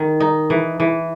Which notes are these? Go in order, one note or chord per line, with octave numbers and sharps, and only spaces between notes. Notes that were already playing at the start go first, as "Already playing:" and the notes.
Already playing: D#3
D#4
E3
E3